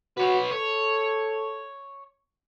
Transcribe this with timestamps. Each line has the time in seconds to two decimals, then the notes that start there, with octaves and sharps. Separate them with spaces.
0.18 F#4 B4 C#5
0.52 A4 C#5